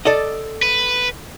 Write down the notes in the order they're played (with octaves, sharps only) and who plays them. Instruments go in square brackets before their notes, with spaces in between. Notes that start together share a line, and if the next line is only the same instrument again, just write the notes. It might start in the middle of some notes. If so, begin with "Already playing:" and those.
[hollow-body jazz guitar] A4 D5 D#5
[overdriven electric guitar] B4